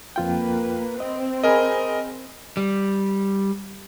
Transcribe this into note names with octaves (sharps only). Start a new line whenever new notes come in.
F2 A#3 F4 B4 G5
C4 D#5
G#4 A#4 D#5 G#5 B5
G3